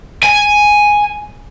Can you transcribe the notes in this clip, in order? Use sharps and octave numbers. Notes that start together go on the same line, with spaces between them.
G#5